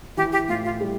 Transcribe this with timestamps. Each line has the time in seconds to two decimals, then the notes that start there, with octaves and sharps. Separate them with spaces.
0.17 E3 G4
0.32 G4
0.48 A2 F4
0.65 F4
0.80 G3